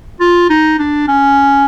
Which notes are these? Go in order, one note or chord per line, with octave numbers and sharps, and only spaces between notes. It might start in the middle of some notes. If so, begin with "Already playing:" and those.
F4
D#4
D4
C#4